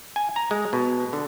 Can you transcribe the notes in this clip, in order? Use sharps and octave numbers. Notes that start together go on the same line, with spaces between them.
G#5
A#5
G#3
B2
D3